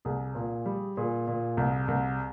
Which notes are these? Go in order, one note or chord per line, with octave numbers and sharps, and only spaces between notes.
C2 G#4
A#2
G3
A#2 G#4
A#2
C2
C2